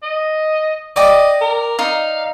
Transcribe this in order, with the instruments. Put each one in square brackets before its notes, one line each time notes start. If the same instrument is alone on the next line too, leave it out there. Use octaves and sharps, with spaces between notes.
[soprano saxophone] D#5
[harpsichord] D5 [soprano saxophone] D#5 [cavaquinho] G5 D6
[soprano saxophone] A#4
[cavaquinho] D#4 [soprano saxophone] F5